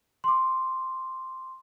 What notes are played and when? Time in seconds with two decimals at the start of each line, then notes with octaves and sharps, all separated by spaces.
0.24 C6 D6